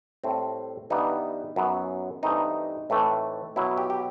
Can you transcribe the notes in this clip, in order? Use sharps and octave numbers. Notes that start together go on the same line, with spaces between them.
A2 G3 C4
G2 E3 G3 B3 D#4
F#2 F#3 B3
G2 E3 A3 C4 D#4
A2 E3 A3 C4
B2 F#3 B3 E4
G4
G4